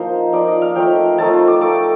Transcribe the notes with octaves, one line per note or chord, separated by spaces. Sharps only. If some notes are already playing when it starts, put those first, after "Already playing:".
Already playing: F3 A#3 D#4 C5
F3 A#3 D#4 D5
D#5
F5
F3 A3 D#4 G5
F3 A3 D#4 A5
C6
D6
A3 D#4 D6